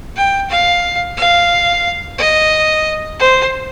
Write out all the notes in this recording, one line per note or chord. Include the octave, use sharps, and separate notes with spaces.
G5
F5
F5
D#5
C5